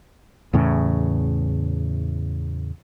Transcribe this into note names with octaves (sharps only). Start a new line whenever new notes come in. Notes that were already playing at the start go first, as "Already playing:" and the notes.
E2 A2 C#3